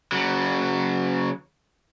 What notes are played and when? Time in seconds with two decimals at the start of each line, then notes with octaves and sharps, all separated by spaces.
0.12 C#3 F#3